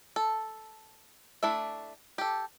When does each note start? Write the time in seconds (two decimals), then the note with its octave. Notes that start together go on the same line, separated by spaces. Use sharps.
0.16 A4
1.43 A3 D4 E4 E5
2.18 G4 A4